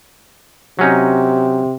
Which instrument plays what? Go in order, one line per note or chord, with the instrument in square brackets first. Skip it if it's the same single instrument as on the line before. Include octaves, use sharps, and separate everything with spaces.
[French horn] C3 [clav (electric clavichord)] F#3 C#4 D#4